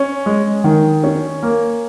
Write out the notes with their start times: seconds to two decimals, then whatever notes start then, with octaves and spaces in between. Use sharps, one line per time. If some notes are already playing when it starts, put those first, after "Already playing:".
Already playing: C#4
0.26 G#3
0.64 D#3
1.04 C#4
1.43 A#3